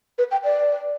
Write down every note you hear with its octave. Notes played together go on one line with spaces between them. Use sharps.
B4
G5
D5